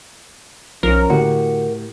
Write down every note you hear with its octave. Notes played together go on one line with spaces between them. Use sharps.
B1 F3 C#4 A#4
A2 D3 F#4 G4